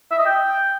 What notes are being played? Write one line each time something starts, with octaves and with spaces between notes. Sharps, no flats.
E5
D#5
G5